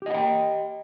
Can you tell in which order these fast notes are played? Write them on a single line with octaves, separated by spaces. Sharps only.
G4 D#5 F#5 G5